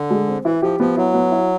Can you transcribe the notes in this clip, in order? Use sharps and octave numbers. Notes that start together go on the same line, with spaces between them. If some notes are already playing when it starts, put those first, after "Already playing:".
Already playing: D3
G#3
C4
E3 E4
F3 G4
F3 B3
F#3 E4
B3
E4